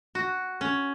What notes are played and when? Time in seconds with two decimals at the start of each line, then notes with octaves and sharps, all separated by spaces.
0.15 F#4
0.61 C#4